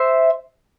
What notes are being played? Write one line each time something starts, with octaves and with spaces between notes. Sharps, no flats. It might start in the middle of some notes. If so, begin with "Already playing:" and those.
Already playing: C5 E5